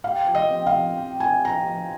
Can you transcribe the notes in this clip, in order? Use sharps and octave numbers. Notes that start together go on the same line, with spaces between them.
G4 F5
F3
D#5
C4
F5
F3
G4
F3 G#5
C4 A#5
F3